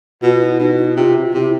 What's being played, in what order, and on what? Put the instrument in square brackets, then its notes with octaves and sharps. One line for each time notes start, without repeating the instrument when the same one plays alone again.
[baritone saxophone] B2 [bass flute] F4
[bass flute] E4
[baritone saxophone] B2 [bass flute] D#4
[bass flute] E4
[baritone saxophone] C3 [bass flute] F4
[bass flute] F4
[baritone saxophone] C3 [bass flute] E4